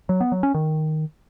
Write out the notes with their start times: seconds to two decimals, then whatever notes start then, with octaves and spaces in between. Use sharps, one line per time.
0.09 F#3
0.20 B3
0.32 F#3
0.43 C#4
0.54 D#3